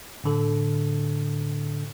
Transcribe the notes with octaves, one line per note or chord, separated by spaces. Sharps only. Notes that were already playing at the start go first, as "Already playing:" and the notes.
A2 D3 A4